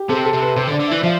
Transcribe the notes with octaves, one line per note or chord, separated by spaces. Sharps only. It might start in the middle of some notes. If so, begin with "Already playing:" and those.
Already playing: G4
C3 A4
A4
C3
B4
C3 C5
D3
D5
D3
E5
E3
F3 E5